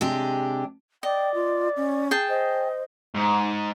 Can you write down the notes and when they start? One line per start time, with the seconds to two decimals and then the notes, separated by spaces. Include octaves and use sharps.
0.01 C3 G#3 D4 G4
1.03 D5 D#5 G5
1.34 F4
1.76 C#4
2.11 G#4 G5 A5
2.29 C5 D#5
3.14 G#2